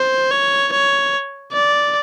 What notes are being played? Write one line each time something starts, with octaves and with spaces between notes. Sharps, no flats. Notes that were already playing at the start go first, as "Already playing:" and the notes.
Already playing: C5
C#5
C#5
D5